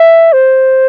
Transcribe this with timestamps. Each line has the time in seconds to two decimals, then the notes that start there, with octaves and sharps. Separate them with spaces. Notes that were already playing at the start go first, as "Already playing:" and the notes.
Already playing: E5
0.33 C5